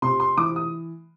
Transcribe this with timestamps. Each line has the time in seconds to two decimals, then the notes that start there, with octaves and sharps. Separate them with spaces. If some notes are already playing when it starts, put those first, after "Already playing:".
0.02 C3 C6
0.20 C6
0.37 E3 D6
0.56 D#6